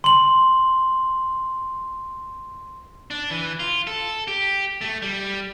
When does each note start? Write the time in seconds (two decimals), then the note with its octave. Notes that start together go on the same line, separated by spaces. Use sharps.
0.04 C6 F#7
3.11 D4
3.31 E3
3.60 F4
3.87 A4
4.28 G4
4.81 A3
5.02 G3